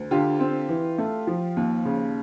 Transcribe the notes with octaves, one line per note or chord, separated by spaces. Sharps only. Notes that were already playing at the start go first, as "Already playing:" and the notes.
Already playing: D2
D3 F4 G4
C4
E3
A3
F3
D#2
C#3